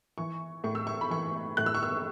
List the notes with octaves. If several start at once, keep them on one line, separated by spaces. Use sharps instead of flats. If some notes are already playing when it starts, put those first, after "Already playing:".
E3 C#6
A2 C#6
E6
C#6
B5
E3 C#6
A2 F#6
E6
C#6
E6